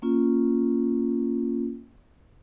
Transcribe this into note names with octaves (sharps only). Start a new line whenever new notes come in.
A#3 C#4 F4